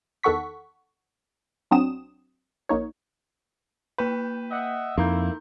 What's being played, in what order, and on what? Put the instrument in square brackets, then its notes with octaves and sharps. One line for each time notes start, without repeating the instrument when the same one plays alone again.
[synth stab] E2 D#3 A4 F#5 C#6 B6
B1 F#3 C4 D4 D#6 E7
A#1 A#3 D#4 C#5
[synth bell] A#3 G5 G6 [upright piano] B4
[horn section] D#5 E5 F#5
[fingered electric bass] F2 [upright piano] A#3 [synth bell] D#4 A#5 G6 [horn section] E4